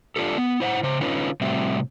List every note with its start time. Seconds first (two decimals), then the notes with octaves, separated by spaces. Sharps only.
0.16 D4 F4 G4 A4
0.38 B3
0.60 E4 C5 F5 F#5
0.83 C#3 C5
1.01 D3 C#4 D#4 F4 B4
1.41 A2 C3 G3 C4 F#4 E5